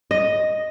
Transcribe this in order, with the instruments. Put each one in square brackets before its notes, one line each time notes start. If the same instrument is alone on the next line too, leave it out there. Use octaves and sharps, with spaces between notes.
[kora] D#5